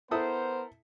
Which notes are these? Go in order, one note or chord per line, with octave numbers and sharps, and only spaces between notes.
B3 E4 A4 A#4 C5 D#6